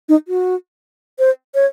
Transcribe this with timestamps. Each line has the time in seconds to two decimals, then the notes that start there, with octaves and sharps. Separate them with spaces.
0.09 D#4
0.28 F#4
1.19 C5
1.55 C#5